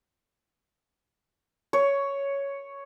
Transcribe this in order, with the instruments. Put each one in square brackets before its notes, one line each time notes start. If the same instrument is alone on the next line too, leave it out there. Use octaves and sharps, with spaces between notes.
[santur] C#5